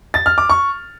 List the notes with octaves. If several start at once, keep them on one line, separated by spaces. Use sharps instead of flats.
A6
F6
D6
C#6